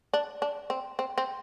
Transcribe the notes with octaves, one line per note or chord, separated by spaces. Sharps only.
D4
D4
C4
C4
C4